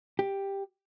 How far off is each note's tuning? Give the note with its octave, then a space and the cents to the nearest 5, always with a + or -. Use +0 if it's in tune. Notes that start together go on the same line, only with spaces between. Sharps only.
G4 +5